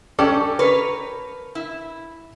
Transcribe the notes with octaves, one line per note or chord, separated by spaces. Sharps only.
C#4 G4 A4 D5
A#4 B4 C#5
E4